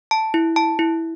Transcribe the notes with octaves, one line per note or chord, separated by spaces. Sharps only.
A5
E4
A5
E4